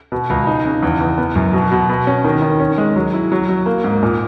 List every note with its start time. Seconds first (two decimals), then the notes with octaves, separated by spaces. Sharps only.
0.12 B2
0.30 C#2
0.47 D#4
0.66 C#3
0.83 E2
1.01 E2
1.18 B3
1.35 F#2
1.53 B2
1.72 B2
1.89 B2
2.07 C#4
2.24 D#3
2.42 D#3
2.60 C#4
2.78 G#3
2.96 F#3
3.14 E4
3.32 F#3
3.49 F#3
3.66 A#3
3.84 G#2
4.03 A#2